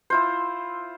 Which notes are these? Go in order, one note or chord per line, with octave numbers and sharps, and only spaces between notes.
E4 F4 C5